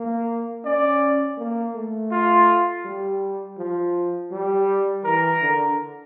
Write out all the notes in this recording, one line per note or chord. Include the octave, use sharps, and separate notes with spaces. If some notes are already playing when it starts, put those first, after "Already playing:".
Already playing: A#3
C#4 D5
A#3
A3
F4
G3
F3
G3
E3 A#4
D3